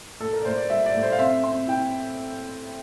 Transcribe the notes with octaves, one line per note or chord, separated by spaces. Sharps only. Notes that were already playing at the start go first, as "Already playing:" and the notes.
A2 A4
A#4
D5
A2 C5
D5
G3 E5
D5
A2
C5
F5
C4 E5
C4
E4 G5